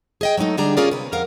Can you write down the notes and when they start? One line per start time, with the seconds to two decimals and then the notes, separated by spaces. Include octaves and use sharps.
0.21 G#4 D#5 G5
0.37 F#3 G#3 A3 D#4 A4
0.57 D3 G3 D4 G4 G#4 A#5
0.77 C#4 F4 G#4 A#4 D5
0.91 C3 B4
1.12 F2 A#4 F5 F#5